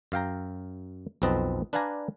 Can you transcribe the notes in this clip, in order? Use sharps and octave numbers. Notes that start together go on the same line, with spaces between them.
F#2 F5 G5 A#5
B1 F2 C4 B4 D#5 A5
D4 B4 D5 F5 G#5 A#5